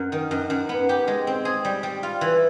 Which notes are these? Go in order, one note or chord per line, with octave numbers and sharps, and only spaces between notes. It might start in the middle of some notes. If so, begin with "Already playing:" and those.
Already playing: F#2
D#3
F#2
F#2
B3
G4
G#3
C4
G#4
G3
G3
F4
E3